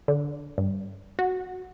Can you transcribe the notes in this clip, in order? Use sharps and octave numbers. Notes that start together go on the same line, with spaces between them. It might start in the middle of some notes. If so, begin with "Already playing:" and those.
D3
G2
F#4